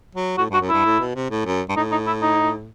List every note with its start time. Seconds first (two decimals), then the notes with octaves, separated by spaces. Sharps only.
0.15 F#3
0.38 A2 F#4
0.50 G2 F#4
0.61 F#2
0.69 G2 E4
0.85 A2
0.99 B2
1.15 C3
1.30 A2
1.45 F#2
1.69 G2
1.76 A2 D#4
1.92 D#4
2.07 E4
2.22 D#4